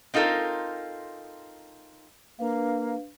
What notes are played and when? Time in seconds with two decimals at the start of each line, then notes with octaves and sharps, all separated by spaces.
0.14 C4 D#4 F4 A4 A#4
2.39 A#3 D4 B4 F5